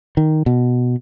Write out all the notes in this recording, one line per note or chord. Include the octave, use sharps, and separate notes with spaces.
D#3
B2